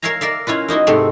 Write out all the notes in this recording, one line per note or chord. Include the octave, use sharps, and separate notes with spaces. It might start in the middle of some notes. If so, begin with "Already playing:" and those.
A#4 C#5 E5 F5 G#5 A#5
A#4 D5 E5 F5
C#4 E4 F4 B4
A#3 D#4 E4 F#4
G#2 C3 A3 C4